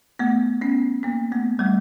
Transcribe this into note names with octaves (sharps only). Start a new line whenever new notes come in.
A3 B3
B3 C#4
A#3 C4
A3 B3
G3 A3